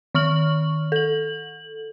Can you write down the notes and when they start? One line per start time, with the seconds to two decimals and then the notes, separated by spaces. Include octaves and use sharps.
0.14 D#3 C#6 F6 F#7
0.92 A4 F#7